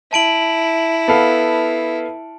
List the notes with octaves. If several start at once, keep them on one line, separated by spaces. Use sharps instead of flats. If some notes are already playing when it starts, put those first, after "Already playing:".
E4 A5 D7 F#7
B3 A4 F5